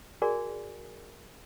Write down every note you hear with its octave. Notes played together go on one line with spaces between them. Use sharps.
F#4 G#4 A#4 D5 G#5